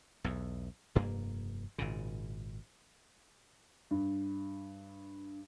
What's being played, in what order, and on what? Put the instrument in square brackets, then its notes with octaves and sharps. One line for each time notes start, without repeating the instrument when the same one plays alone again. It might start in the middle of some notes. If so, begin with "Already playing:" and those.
[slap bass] B1 E2
F1 G2 A#3
G#1 A#2 C#3
[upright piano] G2